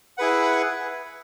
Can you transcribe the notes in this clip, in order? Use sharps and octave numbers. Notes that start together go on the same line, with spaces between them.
E4 G#4 B4 F#5